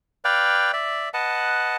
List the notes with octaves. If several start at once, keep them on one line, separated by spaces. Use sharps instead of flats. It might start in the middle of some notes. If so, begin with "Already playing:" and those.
B4 D5 F5 G5
D5 E5
B4 D#5 F#5 A5